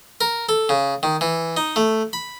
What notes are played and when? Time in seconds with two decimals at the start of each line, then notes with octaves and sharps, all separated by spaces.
0.21 A#4
0.49 A4
0.69 C#3
1.03 D#3
1.21 E3
1.57 D#4
1.76 A3
2.13 B5